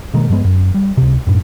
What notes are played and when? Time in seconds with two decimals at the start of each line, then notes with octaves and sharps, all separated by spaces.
0.14 B2 D#3 G#3 A#3
0.29 G2 F3 G#3 B3
0.44 F#2
0.74 G3
0.97 C#2 C3
1.27 F#2 A2